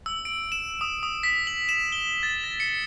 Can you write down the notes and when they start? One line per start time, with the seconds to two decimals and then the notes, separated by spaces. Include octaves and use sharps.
0.06 E6
0.25 D7
0.52 E7
0.81 D#6
1.03 D#6
1.23 B6
1.47 F#7
1.69 E7
1.92 G7
2.23 A6
2.44 A#6
2.60 C#7